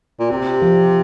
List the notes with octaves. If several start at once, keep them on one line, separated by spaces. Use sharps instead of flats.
A#2
C3 G4
F3